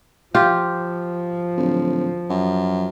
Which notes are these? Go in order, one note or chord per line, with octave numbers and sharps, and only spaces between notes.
F3 F4 G4
D1
F#2